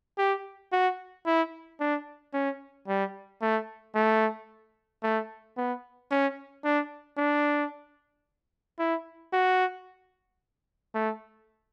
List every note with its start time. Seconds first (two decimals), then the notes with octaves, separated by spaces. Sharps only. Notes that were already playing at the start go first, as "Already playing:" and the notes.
0.18 G4
0.72 F#4
1.26 E4
1.80 D4
2.34 C#4
2.88 G3
3.42 A3
3.95 A3
5.03 A3
5.57 B3
6.11 C#4
6.64 D4
7.18 D4
8.79 E4
9.33 F#4
10.94 A3